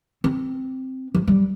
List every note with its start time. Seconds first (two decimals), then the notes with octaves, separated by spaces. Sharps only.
0.24 C4
1.15 F3
1.28 G3